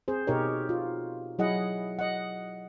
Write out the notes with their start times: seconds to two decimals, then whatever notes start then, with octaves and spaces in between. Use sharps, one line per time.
0.08 C4 G#4 C5
0.27 B2 D#4 G4 A#4 C#5
0.69 F4
1.39 F#3 E4 G#4 D#5 F#5
1.99 D#5 F#5